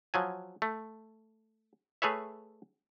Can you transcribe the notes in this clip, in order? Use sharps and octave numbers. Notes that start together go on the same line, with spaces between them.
F3 F#3 G#5
A3
A3 G#4 B4 C#5 E5